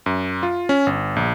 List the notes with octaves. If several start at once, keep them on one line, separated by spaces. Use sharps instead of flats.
F#2
F4
C#4
G1
A#1